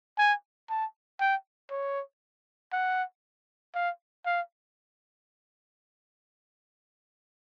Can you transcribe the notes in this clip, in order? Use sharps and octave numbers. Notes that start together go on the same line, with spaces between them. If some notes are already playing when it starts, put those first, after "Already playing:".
G#5
A5
G5
C#5
F#5
F5
F5